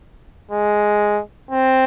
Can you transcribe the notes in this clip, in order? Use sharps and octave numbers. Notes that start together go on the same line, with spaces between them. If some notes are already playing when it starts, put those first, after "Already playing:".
G#3
C4